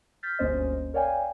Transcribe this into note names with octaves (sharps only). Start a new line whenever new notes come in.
F6 G6 A6 B6
G1 D2 A#3 C#4 C5 D#5
A#4 C#5 D5 F5 G5 G#5